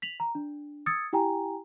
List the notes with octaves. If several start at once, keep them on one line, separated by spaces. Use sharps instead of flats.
B6 F7 F#7
A#5
D4
D#6 E6 G#6 A6 C#7
E4 G4 G5 G#5 A#5